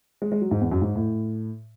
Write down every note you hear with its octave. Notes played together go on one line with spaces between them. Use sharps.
G#3
G#3
F#3
G#2
E2
F#2
G#2
A2